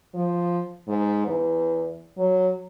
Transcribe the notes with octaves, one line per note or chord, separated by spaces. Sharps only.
F3
G#2
E2
F#3